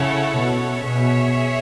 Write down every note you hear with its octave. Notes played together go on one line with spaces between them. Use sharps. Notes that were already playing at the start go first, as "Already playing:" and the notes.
Already playing: C#3 C#4 E4 A4 C#5 F#5
B2
B2 G#4 C#5 E5